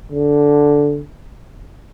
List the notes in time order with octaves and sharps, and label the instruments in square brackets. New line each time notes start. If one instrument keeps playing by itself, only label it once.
[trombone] D3